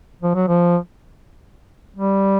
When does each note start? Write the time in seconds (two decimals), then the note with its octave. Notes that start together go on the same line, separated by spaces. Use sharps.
0.22 F3
0.35 F#3
0.48 F3
1.96 G3